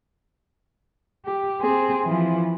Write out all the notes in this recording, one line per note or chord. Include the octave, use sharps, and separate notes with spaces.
G4
C4 G#4
E3 F3